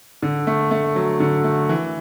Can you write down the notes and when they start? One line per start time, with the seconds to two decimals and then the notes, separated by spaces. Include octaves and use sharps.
0.23 D3
0.47 A3
0.71 A3
0.96 F#3
1.20 D3
1.44 A3
1.69 E3